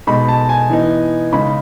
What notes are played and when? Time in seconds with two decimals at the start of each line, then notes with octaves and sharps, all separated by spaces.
0.07 B2 G#3 D#4 B5
0.28 A5
0.49 G#5
0.70 E3 B3 D#4
1.33 C#3 G#3 D#4 B5